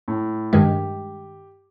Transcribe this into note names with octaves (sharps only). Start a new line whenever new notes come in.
A2
G2 D#3 G#3 G4